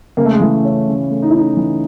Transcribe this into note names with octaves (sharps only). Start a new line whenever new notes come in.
C#3 A#3
A3
G#3
E3 A3
C#4
C#3
A3
D#4
E4
C#4 D#4
E3